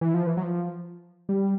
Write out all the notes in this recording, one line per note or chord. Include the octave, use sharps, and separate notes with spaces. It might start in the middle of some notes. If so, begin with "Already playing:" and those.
E3
F3
E3
F#3
F3
G3